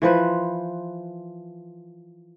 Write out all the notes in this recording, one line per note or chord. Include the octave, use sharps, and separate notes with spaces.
E3 F3 B4 C5